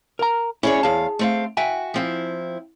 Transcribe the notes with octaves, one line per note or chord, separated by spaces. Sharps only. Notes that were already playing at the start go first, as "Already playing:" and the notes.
A#4 A#5
C#4 E4 G#4 C#5 D5
E2 G#4 F5 A5
A3 C4 F5
F#4 E5 G5 G#5
F3 C4 E4